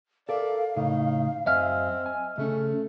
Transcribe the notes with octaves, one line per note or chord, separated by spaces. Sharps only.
A4 A#4 D5 E5 F5
A2 C#3 D#4
F#2 C4 D#5 E5 G#5 F6
G#5
C#3 A3 C#4